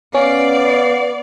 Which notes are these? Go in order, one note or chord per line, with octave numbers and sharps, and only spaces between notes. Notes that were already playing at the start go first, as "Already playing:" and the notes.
B3 C#4 D5 F5